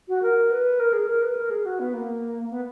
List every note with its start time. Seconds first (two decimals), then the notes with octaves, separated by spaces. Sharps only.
0.09 F#4
0.22 A#4
0.51 B4
0.80 A#4
0.93 G#4
1.08 A#4
1.22 B4
1.37 A#4
1.51 G#4
1.66 F#4
1.80 B3
1.94 A#3
2.51 B3